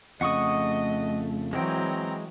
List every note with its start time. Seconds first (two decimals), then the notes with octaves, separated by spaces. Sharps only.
0.21 F2 C#3 A3 D#5 F#5 C#6 D#6
1.53 E3 F#3 G#3 C4 G5 A#5